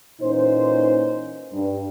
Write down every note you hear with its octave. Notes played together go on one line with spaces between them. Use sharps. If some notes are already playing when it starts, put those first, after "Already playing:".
A#2 E3 C#4 D#4 C5
G2